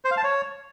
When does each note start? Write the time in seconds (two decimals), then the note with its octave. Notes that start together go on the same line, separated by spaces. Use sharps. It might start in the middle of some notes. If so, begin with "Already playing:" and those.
0.05 C5
0.11 F5
0.17 A5
0.24 C#5